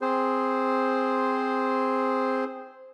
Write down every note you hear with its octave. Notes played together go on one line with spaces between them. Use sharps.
C4 G#4 C5